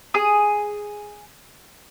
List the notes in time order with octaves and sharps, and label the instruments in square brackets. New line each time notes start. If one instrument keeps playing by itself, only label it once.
[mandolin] G#4 D#6